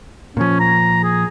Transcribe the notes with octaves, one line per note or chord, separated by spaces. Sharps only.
A#2 F3 C#4
A#5
G#4